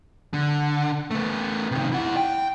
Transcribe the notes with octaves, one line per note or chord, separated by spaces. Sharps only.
D3
A3 B3
C3 D#3
E4 F#5
G5